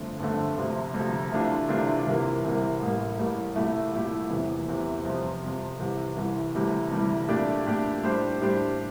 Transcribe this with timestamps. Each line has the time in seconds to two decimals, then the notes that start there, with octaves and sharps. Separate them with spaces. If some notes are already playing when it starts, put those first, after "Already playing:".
Already playing: G1 F2 D3 A3
0.20 G1 F2 D3 A3
0.57 D2 C3 F3
0.94 D2 C3 F3
1.32 C3 E3 A3 D4 F4
1.69 C3 E3 A3 D4 F4
2.06 C2 C3 E3 A#3
2.43 C2 C3 E3 A#3
2.81 A1 A2 G3 A#3
3.18 A1 A2 G3 A#3
3.55 C2 A#2 A3 E4 G4
3.93 C2 A#2 A3 E4 G4
4.30 F1 E2 C3 E3
4.67 F1 E2 C3 E3
5.05 F2 C3 F3
5.42 F2 C3 F3
5.79 C2 C3 E3
6.17 C2 C3 E3
6.54 D2 C3 E3 G3
6.92 D2 C3 E3 G3
7.28 A#2 A3 D4 G4 D5
7.66 A#2 A3 D4 G4 D5
8.03 A2 G3 D4 G4 C5
8.41 A2 G3 D4 G4 C5